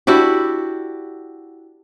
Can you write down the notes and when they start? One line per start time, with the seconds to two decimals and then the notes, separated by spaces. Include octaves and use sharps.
0.07 D4 E4 F#4 G4